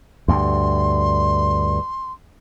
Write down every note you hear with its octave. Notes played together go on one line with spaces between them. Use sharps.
D2 G2 C6